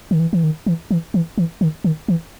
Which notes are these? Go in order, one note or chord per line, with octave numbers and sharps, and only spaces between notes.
D#3
E3
E3
D#3
E3
E3
E3
E3
D#3
D#3
E3